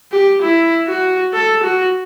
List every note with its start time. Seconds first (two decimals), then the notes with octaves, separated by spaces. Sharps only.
0.12 G4
0.42 E4
0.88 F#4
1.33 A4
1.63 F#4